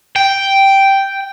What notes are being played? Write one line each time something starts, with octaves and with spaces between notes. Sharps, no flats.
G5